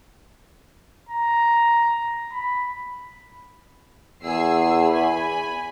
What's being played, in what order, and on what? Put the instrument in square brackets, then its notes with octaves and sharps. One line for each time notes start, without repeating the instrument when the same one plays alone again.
[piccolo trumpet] A#5
B5
[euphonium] E2 [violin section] G#4 E6 C7
[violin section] G#5 B5